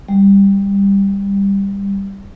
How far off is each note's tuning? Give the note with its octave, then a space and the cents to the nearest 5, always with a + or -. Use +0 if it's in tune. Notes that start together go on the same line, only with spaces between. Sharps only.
G3 +15